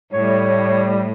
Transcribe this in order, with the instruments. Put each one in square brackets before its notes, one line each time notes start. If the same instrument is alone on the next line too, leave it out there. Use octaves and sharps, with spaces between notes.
[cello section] A2 [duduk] G3 [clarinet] C#5